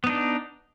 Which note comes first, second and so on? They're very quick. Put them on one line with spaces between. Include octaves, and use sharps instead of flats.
B3 D#4 D4